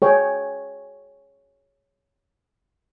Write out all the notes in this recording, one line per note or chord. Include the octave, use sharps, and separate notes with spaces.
G#4 C#5 G5